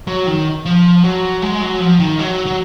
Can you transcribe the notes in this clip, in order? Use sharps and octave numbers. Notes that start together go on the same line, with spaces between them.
F#3
D#3
F3
F#3
G#3
F#3
F3
D#3
F#3
F#3